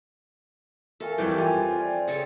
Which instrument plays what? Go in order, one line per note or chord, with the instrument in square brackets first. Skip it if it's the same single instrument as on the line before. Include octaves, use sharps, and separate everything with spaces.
[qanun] A4 [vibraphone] A#4 E5 [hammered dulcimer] C#5 F5 G#5
[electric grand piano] F2 E3 G3 [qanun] G4
[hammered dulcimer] C4 G#5 [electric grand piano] F4
[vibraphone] D5 G5
[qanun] C#3 A4 C#5